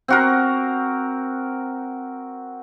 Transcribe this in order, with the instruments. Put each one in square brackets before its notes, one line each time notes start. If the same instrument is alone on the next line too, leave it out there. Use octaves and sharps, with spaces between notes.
[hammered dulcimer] C4 F#4 A#4